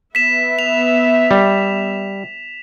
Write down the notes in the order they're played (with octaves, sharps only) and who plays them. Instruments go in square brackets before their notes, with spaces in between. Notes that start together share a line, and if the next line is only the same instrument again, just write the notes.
[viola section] B3 E5 [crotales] B6 E7
[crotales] F7
[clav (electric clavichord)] G3